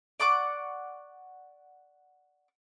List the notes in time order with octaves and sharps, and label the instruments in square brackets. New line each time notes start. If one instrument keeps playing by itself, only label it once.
[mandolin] D5 F#5 C#6 D6